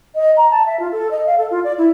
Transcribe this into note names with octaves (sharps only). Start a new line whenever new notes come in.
D#5
A#5
A5
E5
F4
A4
D#5
F5
A4
F4
D5
E4